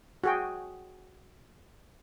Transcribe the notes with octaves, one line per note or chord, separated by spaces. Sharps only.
F#4 G#4 G5